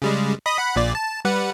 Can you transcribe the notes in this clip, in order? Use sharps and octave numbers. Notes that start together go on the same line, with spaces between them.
C#3 G3 G#3
D#5 B5 D#6
F#5 B5
A#1 A#2 D5
A5
G3 B4 F#5